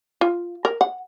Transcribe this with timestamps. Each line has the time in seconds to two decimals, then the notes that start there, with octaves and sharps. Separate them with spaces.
0.21 F4
0.65 A#4
0.81 F#5